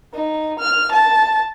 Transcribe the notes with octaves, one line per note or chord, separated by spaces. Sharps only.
D#4
F6
A5